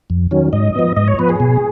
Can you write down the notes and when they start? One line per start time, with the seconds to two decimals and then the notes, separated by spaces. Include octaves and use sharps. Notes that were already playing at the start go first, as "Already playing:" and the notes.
0.10 F2
0.31 D#3 F#3 C#4
0.53 G#2 D#5
0.75 F3 B3
0.96 G#2 D#5
1.08 C#5
1.19 F3 B3 B4
1.29 G#4
1.40 B2